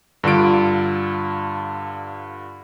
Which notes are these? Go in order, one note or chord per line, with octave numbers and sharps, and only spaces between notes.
G2 D3 F4 D7